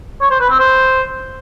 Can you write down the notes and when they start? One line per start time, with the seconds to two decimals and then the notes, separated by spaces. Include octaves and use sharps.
0.21 C#5
0.31 C5
0.40 B4
0.50 C4
0.59 C5